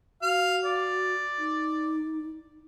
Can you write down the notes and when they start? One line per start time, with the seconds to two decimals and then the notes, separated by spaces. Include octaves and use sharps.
0.22 F#4 F5
0.65 D5
1.38 D#4